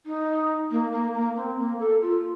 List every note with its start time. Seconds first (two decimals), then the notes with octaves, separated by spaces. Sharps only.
0.06 D#4
0.71 A#3
0.93 A#3
1.14 A#3
1.37 C4
1.58 A#3
1.80 A4
2.02 F4